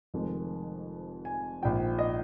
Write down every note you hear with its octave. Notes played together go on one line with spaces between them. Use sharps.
F1 F2 D#3 G#3
G#5
A#1 G#2 F3 G5
D#5